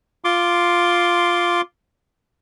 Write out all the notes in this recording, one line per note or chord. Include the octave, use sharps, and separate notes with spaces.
F4 C6 D6